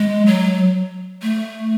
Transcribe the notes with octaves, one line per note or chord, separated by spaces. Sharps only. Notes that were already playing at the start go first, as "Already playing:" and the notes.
Already playing: G#3
F#3
A3